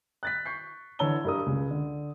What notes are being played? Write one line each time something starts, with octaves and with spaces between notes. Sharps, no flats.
F#6 A6 B6
C#6 G6 C7
D3 E3 C#5 A5 E6 G7
G2 A#4 D#6
C#2
D3